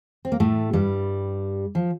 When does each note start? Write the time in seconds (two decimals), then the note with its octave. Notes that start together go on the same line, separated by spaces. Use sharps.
0.25 C4
0.32 A#3
0.40 A2 A3
0.73 G2 G3
1.75 F3